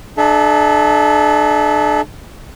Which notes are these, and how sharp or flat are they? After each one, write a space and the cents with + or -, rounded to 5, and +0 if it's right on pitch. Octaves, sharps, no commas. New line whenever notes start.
D4 +35 A4 -40 E5 +5